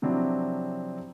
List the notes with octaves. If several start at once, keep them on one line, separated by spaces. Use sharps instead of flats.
C3 F3 F#3 C4 D4 E4